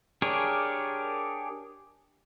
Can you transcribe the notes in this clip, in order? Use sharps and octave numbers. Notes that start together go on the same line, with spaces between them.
D4 G4 G#4 A#4 C#5